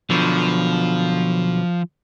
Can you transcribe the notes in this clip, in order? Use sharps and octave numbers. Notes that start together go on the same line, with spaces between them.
B1 B2 D3 F3